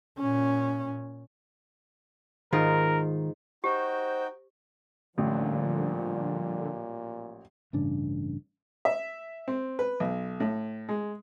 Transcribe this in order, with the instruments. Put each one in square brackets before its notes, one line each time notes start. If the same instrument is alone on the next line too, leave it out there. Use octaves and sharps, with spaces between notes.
[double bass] A#2 C#4
[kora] G#2 D#4 F4 [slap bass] D#3 [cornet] A#4
[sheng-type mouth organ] D#4 F#4 G5 [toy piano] G4 [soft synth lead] C5
[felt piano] A1 [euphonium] A#2 [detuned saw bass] D3 [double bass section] F3 G3
[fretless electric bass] A1 G2 C#3 D4
[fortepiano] E5
C4
B4
B1
A2
G#3